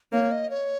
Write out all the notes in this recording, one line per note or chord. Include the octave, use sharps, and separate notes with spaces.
A#3 C#5
D#5
C#5